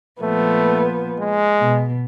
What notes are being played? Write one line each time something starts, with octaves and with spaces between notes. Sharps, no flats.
A#2 F3 A3 B3
G#3
B2